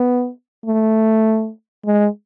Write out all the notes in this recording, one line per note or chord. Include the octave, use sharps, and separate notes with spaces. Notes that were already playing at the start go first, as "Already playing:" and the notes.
Already playing: B3
A3
G#3